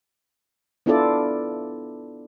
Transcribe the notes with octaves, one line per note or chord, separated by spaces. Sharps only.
B3 D4 E4 F4 A4 D5